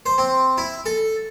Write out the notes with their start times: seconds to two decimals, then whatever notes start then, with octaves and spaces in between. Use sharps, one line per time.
0.06 C5
0.18 C4
0.58 E4
0.86 A4